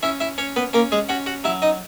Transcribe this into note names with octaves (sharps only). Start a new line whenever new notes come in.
C#4 E4 E5
E4 E5
C#4 C#5
B3 B4
A#3 C#4 A#4
G#3 G#4
C#4 F#4 F#5
F#4 F#5
F#3 E4 E5
D#4 D#5